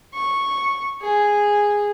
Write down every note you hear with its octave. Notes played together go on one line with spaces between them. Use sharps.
C#6
G#4